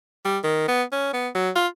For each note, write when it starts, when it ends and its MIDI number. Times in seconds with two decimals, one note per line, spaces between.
0.25 0.38 55
0.43 0.67 51
0.68 0.83 59
0.92 1.13 61
1.13 1.28 59
1.35 1.50 54
1.56 1.67 65